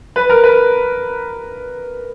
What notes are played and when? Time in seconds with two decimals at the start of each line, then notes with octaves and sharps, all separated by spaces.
0.16 B4
0.30 A#4
0.44 B4